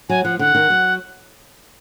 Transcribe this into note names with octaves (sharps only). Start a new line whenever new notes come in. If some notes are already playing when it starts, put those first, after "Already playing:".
F#3 G#5
F3 F#5
D3 F#5
D#3
F#3